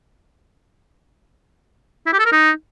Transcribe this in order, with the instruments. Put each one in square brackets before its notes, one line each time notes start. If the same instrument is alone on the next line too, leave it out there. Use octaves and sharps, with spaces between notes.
[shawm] E4
G4
A4
A#4
D#4